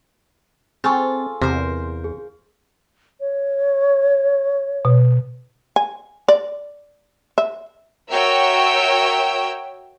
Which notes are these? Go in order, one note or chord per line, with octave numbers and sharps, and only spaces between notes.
C4 F4 G#4 A4 G#5 C#6
E2 C3 A#4 C5
G#4
C#5
B2
G#5
D5
E5
F#4 A#4 C#5 E5 G5 E6